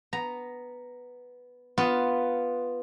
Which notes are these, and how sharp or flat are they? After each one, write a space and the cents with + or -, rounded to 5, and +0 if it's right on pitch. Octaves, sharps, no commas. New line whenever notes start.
B3 +0 A#5 +0
B3 +0 F4 +0